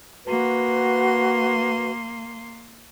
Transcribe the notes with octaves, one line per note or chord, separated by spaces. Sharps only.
A#3 F#4 B4 C6